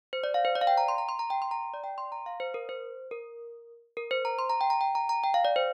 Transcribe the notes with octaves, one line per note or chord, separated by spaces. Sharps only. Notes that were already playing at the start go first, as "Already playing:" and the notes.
C5
D5
F5
C5
D5
F5
G5
A#5
C6
A#5
C6
A#5
G5
C6
A#5
D5
G5
C6
A#5
F5
C5
A#4
C5
A#4
A#4
C5
A#5
C6
A#5
G5
A#5
G5
A#5
A#5
G5
F5
D5
C5